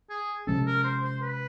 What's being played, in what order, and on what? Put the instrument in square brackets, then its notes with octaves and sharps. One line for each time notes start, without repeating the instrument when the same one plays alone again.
[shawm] G#4
[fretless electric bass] C3 F3 G#3 C#4 [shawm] A4
[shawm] A#4
C5
C5
B4